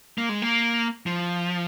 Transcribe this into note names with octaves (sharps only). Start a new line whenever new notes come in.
A#3
G#3
A#3
F3